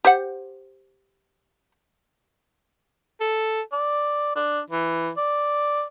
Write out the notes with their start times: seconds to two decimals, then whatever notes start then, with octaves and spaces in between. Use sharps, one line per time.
0.05 G4 C5 F#5
3.20 A4
3.72 D5
4.36 D4
4.70 E3
5.17 D5